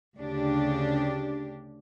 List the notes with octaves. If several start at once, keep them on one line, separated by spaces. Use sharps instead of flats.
D2 C#3 D4 G4